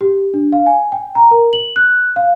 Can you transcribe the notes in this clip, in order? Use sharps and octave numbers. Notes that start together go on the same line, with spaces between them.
G4
D4
F5
G#5
G5
A#5
A#4
F#7
F#6
F5